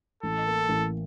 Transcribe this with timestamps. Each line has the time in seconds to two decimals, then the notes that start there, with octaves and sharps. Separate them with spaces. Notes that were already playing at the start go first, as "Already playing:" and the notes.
0.23 A1 A4
0.46 A#3
0.69 A1